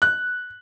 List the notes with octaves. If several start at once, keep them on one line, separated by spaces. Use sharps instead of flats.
F#6